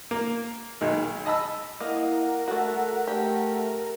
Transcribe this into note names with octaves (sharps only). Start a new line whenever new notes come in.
A#3
B1 D#3 G#3
D#5 A5 B5 E6
A#3 E4 D#5 F#5
A#4
A3 F#4 A4
A3 G4 A4